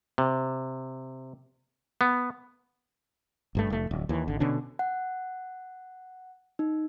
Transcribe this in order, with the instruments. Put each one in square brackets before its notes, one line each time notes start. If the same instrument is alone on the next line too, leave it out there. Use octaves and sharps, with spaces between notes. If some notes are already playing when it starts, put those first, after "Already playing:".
[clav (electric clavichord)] C3
B3
[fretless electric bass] G#1 G2 A3
F1 A3
D1
D#2 E3
G#1 D3
B2 D3 C#4 D4
[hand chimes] F#5
D#4